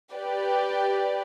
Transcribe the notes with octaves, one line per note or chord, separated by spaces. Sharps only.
G4 B4 D5